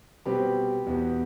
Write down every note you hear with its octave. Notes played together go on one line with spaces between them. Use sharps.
B2 G3 C4 G4 B4
E2 B2 B3